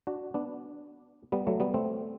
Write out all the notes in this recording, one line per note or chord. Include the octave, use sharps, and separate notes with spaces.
D4 F#4
B3 D4
G3 B3
F#3 A3
G3 B3
A3 C4